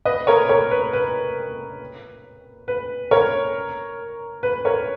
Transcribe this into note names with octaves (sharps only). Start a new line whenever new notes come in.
B4 D#5
A#4 C#5
A#4 C#5
B4
B4
B4
A#4 C#5
B4
A#4 C#5